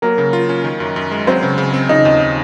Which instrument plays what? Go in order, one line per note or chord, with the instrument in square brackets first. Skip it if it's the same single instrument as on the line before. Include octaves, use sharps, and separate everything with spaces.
[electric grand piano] F#3 [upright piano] A#3 A#4
[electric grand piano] C#3
F4
C#4
D#3
F#2
F#2
G#3
[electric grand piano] F#3 [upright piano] C4 C5
[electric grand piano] C#3
C#3
C4
[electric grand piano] C#3 [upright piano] D#4 D#5
[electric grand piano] D#2